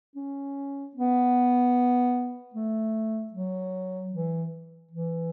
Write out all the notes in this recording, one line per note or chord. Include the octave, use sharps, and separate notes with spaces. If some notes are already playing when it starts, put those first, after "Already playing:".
C#4
B3
A3
F#3
E3
E3